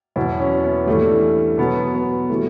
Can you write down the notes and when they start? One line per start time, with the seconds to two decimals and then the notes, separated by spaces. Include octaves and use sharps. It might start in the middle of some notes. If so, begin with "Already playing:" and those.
0.16 E2 B2 F#3 E4
0.40 C#4
0.64 B3
0.87 G2 E3 G3 A3
1.58 B2 F#3 B3
1.94 B3
2.29 E3 G3 A3